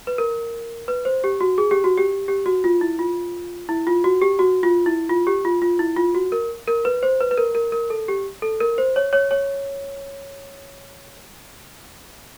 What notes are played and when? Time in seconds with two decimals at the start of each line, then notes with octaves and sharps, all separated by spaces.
0.07 B4
0.18 A#4
0.88 B4
1.05 C5
1.24 G4
1.41 F#4
1.58 G#4
1.71 G4
1.84 F#4
1.97 G4
2.28 G4
2.46 F#4
2.64 F4
2.81 E4
2.99 F4
3.69 E4
3.87 F4
4.04 F#4
4.21 G4
4.39 F#4
4.63 F4
4.86 E4
5.09 F4
5.27 G4
5.45 F4
5.62 F4
5.79 E4
5.97 F4
6.15 F#4
6.32 A#4
6.68 A#4
6.85 B4
7.03 C5
7.21 B4
7.31 B4
7.37 A#4
7.55 A#4
7.72 A#4
7.90 A4
8.08 G4
8.42 A4
8.60 A#4
8.78 C5
8.96 C#5
9.13 C#5
9.31 C#5